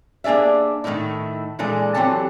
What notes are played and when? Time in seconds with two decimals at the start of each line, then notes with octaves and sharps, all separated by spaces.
0.24 A#3 D4 G#4 D5 E5
0.84 A2 D#3 A3 D#4 E4
1.59 A#2 E3 G#3 D4 A4
1.94 E3 F#3 C4 G4 A4 A5